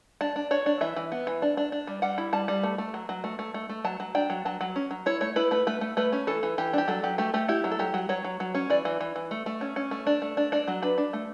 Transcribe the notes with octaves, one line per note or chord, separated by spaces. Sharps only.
D4 A5
D4
D4 C#5
D4
E3 E5
E3
B3
E3
D4
D4
D4
G3
G3 F#5
E4
G3 A5
G3
A3
A3
F#3
F#3
A3
A3
A3
A3
F#3 A5
F#3
D4 G5
F#3
F#3 A5
F#3
C#4
F#3
E4 C#5
A3 C#5
E4 B4
A3 B4
A3 B4
A3
A3 B4
C#4
E3 A4
E3
E3 G4
D4 G4
F#3 A4
F#3 G4
A3 G4
A3 G4
E4 G4
F#3
A4
F#3 G4
F#3
F#3 C#5
F#3
F#3
C#4
E3 D5
E3
E3
E3
A3
A3
C#4
C#4
A3
D4
A3
D4
D4 D5
F#3
D4 B4
D4
A3